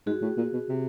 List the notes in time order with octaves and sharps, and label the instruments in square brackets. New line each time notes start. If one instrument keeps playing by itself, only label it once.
[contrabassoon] G#2 [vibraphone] F#4 G#4
[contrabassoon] A2
A#2
B2
C3